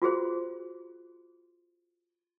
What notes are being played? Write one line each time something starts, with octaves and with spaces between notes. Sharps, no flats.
F4 F#4 G#4 C5